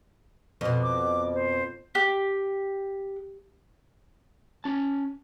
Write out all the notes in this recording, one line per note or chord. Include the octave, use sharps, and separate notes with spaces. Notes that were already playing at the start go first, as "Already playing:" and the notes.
F2 B2
D6
C5
G4
C#4 A5